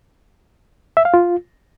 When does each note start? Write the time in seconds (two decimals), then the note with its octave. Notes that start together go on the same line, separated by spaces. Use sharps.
0.97 E5
1.05 F5
1.14 F4